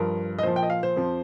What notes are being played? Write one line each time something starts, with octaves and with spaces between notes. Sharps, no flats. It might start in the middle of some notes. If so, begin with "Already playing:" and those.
Already playing: G2 F3 A#4
D#5
A#2 F3 C5
G5
D#5
F5
C5
F2 F3